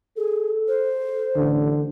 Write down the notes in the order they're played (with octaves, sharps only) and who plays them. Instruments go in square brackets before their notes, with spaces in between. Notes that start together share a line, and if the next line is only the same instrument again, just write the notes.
[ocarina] G#4 [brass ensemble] A4
[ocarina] C5
[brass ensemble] A1 [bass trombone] D3